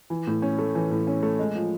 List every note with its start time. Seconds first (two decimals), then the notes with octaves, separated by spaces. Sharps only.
0.10 E3
0.27 A2
0.42 C#4
0.58 A3
0.75 E3
0.91 A2
1.07 C#4
1.23 A3
1.39 G#3
1.55 F3